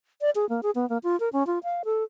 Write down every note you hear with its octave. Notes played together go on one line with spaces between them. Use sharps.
D5
G#4
A#3
G#4
B3
A#3
F4
A#4
C#4
F4
F5
A4